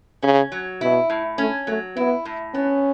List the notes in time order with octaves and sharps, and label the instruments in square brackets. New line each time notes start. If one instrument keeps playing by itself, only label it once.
[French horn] C#3 [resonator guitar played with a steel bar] C#4
[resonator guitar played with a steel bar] F#3
[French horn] B2 [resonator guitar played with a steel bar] E4
[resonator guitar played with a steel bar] A2
[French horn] A3 [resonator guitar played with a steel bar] C#4
[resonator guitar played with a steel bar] F#3 [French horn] A3
[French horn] B3 [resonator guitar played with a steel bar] E4
[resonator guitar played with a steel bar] A2
[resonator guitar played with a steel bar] B3 [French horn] C#4